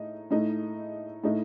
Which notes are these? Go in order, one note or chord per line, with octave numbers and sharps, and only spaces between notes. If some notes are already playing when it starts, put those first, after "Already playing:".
Already playing: A2 D#4
A2 A3 D#4
A2 A3 D#4